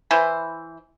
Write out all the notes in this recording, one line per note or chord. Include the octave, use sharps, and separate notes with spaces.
E3 E4 C5